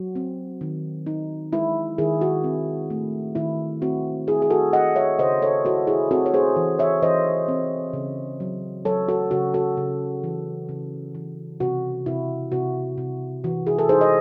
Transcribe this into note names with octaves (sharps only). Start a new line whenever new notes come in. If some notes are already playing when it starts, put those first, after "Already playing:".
Already playing: F#3 F#4
C4
D#3
D#4
G#3 E4
D#3 E4 G#4
F#4
C4
A3
D#3 E4
C4 F#4
E4 G#4
G#4
F#4 A4
E4 D#5 F#5
C#5 E5
C#3 C5 D#5
A4 C#5
E4 F#4 A4
E4 G#4
C4 F#4 A4
C#5
G#4 C5
E3
C#5 E5
E3 C5 D#5
C4
C#3
F#3
F#3 A4 C#5
F#4 A4
C#3 F#4
F#4 A4
C#3
E3
C#3
E3
C3 F#4
C3 E4
C3 F#4
C3
E3 F#4
E4 G#4
A4
D#4 G#4 C5
D#5